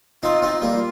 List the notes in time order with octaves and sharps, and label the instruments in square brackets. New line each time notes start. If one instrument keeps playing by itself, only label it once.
[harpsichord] C4 D#4 [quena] F4
[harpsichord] C4 D#4
[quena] F4
[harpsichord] G3 A#3
[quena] F4